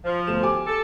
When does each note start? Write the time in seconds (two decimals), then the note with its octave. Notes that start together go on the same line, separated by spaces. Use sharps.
0.05 F3
0.27 G1 A3 E7
0.42 G4 G#5 D6
0.67 A4